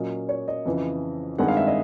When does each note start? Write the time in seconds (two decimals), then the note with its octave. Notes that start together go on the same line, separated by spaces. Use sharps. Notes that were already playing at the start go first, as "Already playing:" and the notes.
Already playing: A#2 F#3 A#3 C#4 D#5
0.29 C#5
0.48 D#5
0.65 F2 C#3 E3
1.38 G2 D#3 G#3 C4 F#5
1.48 F5
1.57 E5
1.67 D#5